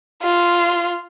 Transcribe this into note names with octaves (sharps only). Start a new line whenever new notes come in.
F4